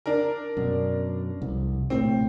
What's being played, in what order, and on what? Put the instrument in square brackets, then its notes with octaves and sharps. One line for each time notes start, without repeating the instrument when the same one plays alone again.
[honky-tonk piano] D4 A#4
[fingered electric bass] F#2 B2
C2 F2
[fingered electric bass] A#1 A2 C3 [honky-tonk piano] C4